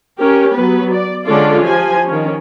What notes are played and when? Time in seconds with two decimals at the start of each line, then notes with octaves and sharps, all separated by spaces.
0.18 C#4 G4 A#4
0.53 F#3 B3 B4
0.93 D5
1.25 D3 G#3 C#4 F4 A4 D5
1.65 F3 G4 G#5
2.07 D#3 C#4